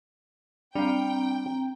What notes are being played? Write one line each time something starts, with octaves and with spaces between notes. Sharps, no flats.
G3 C4 D4 F5 G5 A#5